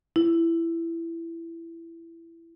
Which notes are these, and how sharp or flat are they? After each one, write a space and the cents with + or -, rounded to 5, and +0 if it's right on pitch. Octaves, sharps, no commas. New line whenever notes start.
E4 +15